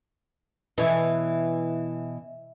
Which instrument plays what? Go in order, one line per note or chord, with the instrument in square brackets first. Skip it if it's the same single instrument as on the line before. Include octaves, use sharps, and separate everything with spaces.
[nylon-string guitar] B2 C#5 [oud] E3